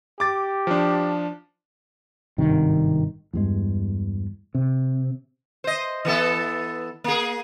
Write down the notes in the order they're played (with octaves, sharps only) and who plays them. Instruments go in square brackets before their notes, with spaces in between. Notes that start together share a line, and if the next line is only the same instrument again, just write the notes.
[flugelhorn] G4 [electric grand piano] D6 A6
[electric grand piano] F3 D4
[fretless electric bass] G#1 G2 C3 D#3
E2 G2 G#3
C3
[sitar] C5 D#5
E3 B3 A4
A#3 G#4